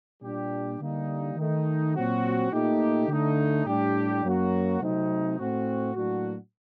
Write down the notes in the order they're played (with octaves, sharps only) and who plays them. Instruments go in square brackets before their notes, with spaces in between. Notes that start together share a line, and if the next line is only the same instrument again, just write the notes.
[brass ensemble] A#2 G3 D4 G4
D3 G3 A#3 D#4
D#3 A3 D#4
A#2 F#3 C4 F#4
A#2 A3 D#4 G4
D3 A3 D#4
A2 G3 D4 G4
F#2 F#3 A#3 F#4
C3 F#3 A3 C4 D#4
A2 A3 C4 F#4
A2 F#3 A#3 D4 F#4